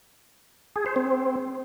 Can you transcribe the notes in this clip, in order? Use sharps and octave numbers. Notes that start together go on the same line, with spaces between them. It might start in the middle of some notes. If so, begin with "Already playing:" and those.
G#4
C5
C4